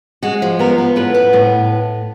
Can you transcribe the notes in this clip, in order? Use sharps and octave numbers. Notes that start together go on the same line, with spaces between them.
G#3 F#4
F3
B3 A#4
B3
A2 B4
B3
A2